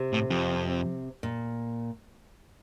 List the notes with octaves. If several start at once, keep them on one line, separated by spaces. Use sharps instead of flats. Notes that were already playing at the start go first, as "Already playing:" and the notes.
Already playing: C3
A2
F2
A#2